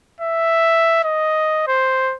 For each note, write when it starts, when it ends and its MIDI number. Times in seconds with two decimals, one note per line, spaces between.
0.21 1.03 76
1.04 1.66 75
1.67 2.15 72